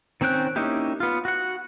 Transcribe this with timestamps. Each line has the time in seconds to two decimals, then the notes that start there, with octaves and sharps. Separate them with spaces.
0.21 D#3 C4 C#4 G5 F#6
0.56 A#3 C#4 D#4 E4 G4
1.00 B3 F4
1.25 F#4 F#5